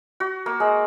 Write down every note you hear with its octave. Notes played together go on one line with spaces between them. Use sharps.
F#4
A#3
G#3